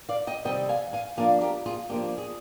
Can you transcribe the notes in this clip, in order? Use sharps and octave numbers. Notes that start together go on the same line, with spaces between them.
D5 F5
D#5 G5
C3 D#3 G3 C4 D#5 G5
F5 G#5
F5 G#5
F3 A#3 D4 F5 G#5
G4 A#4
F4 G#4
F3 A#3 D4 G4
G#4